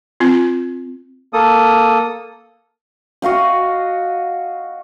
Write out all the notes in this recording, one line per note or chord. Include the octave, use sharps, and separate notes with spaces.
C4 F4
A#3 A4 D#6
F#4 D#5 F5 G5